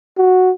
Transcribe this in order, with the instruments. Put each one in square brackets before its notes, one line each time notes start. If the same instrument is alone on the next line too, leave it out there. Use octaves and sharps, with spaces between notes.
[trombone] F#4